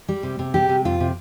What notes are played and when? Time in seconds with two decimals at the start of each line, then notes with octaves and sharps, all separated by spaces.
0.08 G3
0.23 C3
0.39 C3
0.54 G3 G4
0.69 C3
0.85 F2 F4
1.00 C3